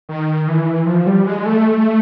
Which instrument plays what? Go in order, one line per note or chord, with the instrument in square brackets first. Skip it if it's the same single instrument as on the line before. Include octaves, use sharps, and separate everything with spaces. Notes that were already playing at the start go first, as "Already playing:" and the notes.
[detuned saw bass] D#3
E3
F3
G3
G#3
A3